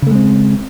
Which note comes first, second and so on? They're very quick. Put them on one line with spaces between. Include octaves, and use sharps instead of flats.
C#3 A3 G#3 C4